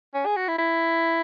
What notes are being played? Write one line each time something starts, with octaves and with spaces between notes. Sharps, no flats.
C#4
G#4
F#4
E4
E4